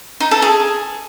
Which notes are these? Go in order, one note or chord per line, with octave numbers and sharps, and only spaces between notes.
D#4
A4
G#4